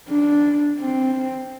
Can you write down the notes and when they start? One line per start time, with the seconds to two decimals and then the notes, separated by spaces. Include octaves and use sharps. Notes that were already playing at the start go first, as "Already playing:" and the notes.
0.10 D4
0.80 C4